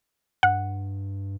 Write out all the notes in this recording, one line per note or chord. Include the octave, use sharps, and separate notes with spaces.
G2 F#5